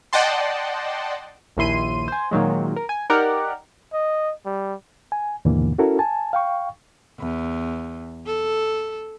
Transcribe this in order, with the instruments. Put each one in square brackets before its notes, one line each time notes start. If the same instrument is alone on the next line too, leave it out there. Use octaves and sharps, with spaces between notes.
[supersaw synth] D5 D#5 F#5 G5 A5 C6
[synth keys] A#1 D#2 E4 C6 D#7
C5 G#5
A#2 D#3 F#3 G#3
A#4
G#5
D#4 G4 A#4 D5 F#5
[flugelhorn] D#5
G3
[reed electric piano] G#5
D#2 G#2 B2 D3 E3 A#3
C#4 E4 F#4 A4 A#4
G#5 A5
F5 G5 C#6
[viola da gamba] E2
A4